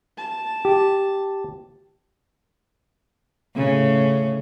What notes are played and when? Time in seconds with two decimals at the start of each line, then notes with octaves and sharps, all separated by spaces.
0.18 A5
0.65 G4
3.56 A2 C#3